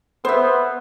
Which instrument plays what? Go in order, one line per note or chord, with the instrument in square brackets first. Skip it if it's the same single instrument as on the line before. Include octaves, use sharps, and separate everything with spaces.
[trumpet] B3 [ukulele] C5 E5